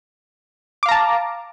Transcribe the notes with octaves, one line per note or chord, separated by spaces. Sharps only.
F5 A5 A#5 D6